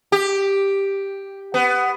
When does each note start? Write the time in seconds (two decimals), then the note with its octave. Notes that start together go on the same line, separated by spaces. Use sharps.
0.12 G4
1.54 B3